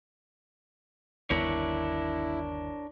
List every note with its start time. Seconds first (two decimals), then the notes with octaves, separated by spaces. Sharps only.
1.30 G1 D#2 B3 D4 E4 A#4 C#5